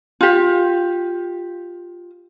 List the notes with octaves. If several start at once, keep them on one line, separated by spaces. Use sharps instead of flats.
F4 G4